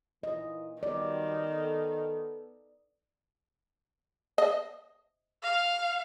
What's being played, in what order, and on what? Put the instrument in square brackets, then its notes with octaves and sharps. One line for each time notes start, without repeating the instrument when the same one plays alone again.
[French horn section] A#2 E3 [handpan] D#5
[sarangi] D#3 [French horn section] F#3 G3 B3 [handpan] D5
[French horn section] B3 A4
[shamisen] D#5
[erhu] F5